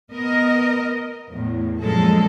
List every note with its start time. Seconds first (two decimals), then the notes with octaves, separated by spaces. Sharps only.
0.12 B3 A#4 D#5
1.28 E2 A2
1.81 F#2 A#2 F3 G#3 A4